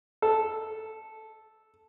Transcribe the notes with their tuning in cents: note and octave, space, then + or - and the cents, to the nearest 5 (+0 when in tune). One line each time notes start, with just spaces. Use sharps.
A4 -5